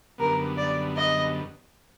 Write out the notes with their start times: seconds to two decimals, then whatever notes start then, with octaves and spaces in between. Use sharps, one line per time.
0.18 F#2 D3 G3 B3 A#4
0.57 D5
0.96 D#5